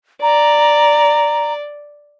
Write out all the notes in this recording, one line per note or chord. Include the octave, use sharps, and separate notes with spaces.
D5 A#5